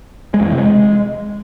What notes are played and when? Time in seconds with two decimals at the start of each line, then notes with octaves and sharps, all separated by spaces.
0.34 G#3
0.40 F2
0.46 E3
0.52 C3
0.58 G#3